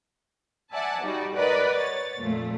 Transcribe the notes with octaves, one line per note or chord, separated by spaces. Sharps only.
D5 E5 F#5 G#5 A5
G3 D#4 F#4 D5
A#4 B4 D5 D#5 F#5 B5
C#5 A6
F2 A#2 A3